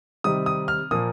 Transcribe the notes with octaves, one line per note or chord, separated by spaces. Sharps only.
C3 D#3 G3 C4 D#4 D#6
D#6
F6
A#2 F3 A#3 F4 D#6